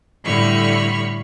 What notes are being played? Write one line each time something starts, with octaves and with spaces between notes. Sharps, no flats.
A2 D3 G3 B5 C#6 F6